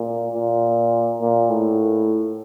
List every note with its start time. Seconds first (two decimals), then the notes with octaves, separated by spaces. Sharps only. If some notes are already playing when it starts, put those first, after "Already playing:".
Already playing: A#2
0.34 A#2
1.21 A#2
1.50 A2